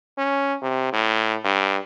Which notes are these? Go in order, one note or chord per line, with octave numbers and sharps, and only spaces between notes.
C#4
C3
A2
G2